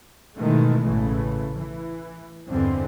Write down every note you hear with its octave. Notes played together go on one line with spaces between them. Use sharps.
G#2 B2 D#3 E3 G#3 A3
A1 C#3 E3 A3
E3
E2 G2 D3 E3 G#3 C4